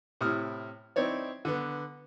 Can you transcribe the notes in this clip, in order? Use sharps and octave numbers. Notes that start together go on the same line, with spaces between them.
A2 C3 E4 D#6 F6
C4 D#4 E4 C#5 D5
D3 B3